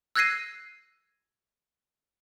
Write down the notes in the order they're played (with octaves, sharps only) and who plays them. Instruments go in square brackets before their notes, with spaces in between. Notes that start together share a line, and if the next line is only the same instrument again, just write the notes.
[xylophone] E6 F#6 G#6 A#6 C7 D#7